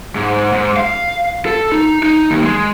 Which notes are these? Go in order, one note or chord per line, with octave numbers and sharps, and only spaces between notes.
G#2
G#2
F5
A4
D#4
D#4
D#2
G#3